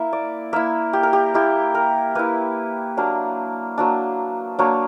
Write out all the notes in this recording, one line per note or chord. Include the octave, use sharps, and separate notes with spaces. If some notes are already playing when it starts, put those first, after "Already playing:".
Already playing: A#3 E4 E5
D5
A#3 E4 E5
G4
A#4
G4
A#3 E4 G4
A#4
A#3 E4 B4
F#3 A#3 D4
F#3 A#3 D4
F#3 A#3 D4 C#5